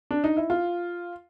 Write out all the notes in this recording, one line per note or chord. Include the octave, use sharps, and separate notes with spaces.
D4
D#4
E4
F4